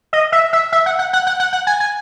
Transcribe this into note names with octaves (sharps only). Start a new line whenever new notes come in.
D#5
E5
E5
E5
F#5
F#5
F#5
F#5
F#5
F#5
G#5
G#5